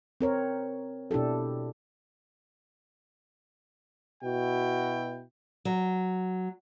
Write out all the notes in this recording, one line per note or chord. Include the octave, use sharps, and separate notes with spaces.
C4 A#4 C#5
B2 D4 E4 G4 A4
B2 E4 F#4 G5
F#3